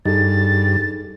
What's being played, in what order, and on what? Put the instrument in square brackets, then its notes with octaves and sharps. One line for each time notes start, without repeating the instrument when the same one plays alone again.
[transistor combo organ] G2 [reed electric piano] D#4 G#4 A4 [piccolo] A6